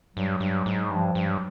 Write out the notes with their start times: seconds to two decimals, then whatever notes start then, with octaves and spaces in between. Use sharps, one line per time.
0.16 G2 F#3
0.40 G2
0.66 G#2
0.90 G2 F3
1.15 G2
1.27 F#3